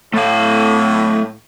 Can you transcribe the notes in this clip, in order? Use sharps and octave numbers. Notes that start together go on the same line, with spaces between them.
A2 A3 F5